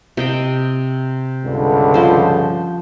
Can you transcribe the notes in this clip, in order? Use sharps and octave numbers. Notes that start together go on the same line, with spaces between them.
C3 D#5 G5
C#2 G2 D3
F3 C5